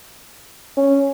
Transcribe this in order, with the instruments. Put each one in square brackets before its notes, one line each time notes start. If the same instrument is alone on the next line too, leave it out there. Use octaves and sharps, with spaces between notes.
[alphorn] C#4